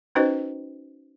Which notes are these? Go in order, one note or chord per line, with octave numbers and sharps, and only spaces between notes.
C#4 D#4 F#4 B4 C5 D#5